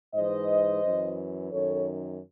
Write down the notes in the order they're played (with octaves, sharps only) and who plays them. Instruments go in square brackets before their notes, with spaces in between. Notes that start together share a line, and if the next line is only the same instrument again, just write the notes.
[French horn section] G#2 E3 C5 D#5
F#2 E3
F#2 D#3 A4 C#5